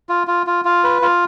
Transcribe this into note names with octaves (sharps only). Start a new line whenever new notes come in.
F4
F4
F4
F4
B4
F4